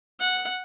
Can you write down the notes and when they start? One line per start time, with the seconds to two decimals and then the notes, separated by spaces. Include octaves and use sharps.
0.19 F#5